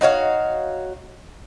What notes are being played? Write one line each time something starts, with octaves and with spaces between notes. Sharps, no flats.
D#4 F#4 C#5 F5